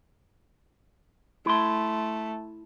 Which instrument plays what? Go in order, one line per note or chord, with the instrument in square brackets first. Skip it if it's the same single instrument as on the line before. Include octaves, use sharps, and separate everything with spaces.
[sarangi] A3 [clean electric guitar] E4 C6